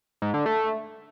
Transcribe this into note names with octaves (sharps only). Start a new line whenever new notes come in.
G#2
D3
A3